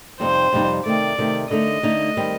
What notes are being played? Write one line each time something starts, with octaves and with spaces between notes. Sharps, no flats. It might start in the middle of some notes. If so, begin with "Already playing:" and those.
F2 C3 G3 C4 D#4 C5
F2 C3 G3 C4 D#4
C3 D#3 A3 D5
C3 D#3 A3
D3 A3 D#4 D#5
D3 A3 D#4
D#3 G3 C4